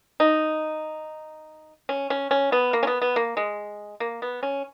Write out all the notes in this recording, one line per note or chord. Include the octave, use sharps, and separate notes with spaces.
D#4
C#4
C#4
C#4
B3
A#3
C#4
B3
B3
A#3
G#3
A#3
B3
C#4